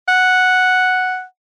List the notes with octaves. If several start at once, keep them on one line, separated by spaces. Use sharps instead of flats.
F#5